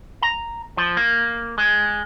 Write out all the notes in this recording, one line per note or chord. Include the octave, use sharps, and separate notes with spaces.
A#5
F3
A#3
G#3